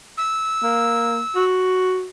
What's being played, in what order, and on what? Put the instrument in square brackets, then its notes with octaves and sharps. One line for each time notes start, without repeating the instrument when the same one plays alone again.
[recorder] E6
[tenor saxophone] A#3
F#4